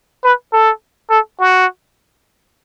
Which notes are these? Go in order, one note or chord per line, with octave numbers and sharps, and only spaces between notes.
B4
A4
A4
F#4